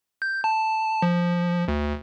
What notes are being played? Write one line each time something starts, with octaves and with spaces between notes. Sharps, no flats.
G6
A5
F3
D2